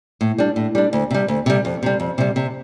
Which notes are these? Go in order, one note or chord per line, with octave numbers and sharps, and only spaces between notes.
A2
G3 D4
A2
G3 D4
D2
C3 G3
D2
C3 G3
F2
C3 G3
F2
C3 G3
C3